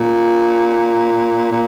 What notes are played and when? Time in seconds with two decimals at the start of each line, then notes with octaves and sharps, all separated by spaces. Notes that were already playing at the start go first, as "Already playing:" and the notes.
Already playing: A#2
1.52 A#2